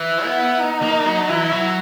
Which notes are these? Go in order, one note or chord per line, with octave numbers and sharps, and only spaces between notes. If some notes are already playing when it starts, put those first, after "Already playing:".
Already playing: E3 E4
B3
D#4
A#3
F#3
E3 E4
F#3